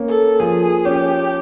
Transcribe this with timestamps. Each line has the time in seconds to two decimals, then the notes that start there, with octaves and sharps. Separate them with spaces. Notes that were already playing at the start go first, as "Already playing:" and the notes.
Already playing: A#3 C#4
0.09 A4
0.39 F3 G#4
0.85 C#4 G4